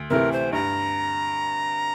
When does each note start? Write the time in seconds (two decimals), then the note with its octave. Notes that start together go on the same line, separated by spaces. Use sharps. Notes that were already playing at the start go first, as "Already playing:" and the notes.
Already playing: D2
0.10 C3 E3 A3 A#4
0.32 C5
0.53 G2 A#5